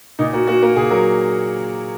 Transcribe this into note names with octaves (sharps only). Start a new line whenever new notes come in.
A#2 D#4
A#3 F#4
A#3 F#4
A#3 F#4
A#2 G#4
F#3 A#4